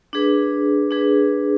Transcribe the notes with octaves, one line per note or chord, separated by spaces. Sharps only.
D4 G#4 B4
D4 G#4 B4